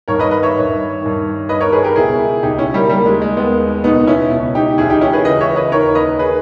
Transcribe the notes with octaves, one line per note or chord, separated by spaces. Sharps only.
G2 D#3 A#4 C#5
B4 D#5
B4 D#5
C#5 E5
G2 D#3
G2 D#3
G2 D#3 B4 D#5
A#4 C#5
G#4 B4
G4 A#4
C#2 B2 E4 G#4
C#2 B2 D#4 G4
C#4 E4
G3 A#3
D#2 D#3 G3 A#3
G#3
G#3
D#2 D#3 G#3 B3
C#2 B2 B3 D#4
C#4 E4
C#2 B2
D#4 G4
C#2 C#3 E3 E4 G#4
D#4 G4
C#4 E4
G#4 B4
C#2 C#3 E3 B4 D#5
C#5 E5
B4 D#5
D#2 D#3 A#4 C#5
B4 D#5
D#3 G#4 B4